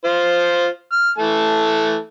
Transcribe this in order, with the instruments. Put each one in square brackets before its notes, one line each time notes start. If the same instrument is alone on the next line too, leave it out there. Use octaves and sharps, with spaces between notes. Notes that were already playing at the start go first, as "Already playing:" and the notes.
[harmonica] F4 C5
F6
E3 A3 A5